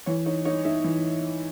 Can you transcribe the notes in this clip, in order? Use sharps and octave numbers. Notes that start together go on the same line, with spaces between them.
E3 C#5
D#4 C#5
D#4 C#5
D#4 E5
E3